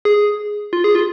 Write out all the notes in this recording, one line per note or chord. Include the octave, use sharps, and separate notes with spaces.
G#4
F4
G#4
F4